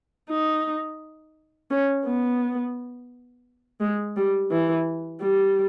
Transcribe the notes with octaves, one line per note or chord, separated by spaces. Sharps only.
D#4
C#4
B3
G#3
G3
E3
G3